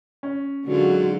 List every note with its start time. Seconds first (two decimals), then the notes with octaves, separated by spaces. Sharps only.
0.23 C#4
0.65 G#2 D3 F#3 F4 F#4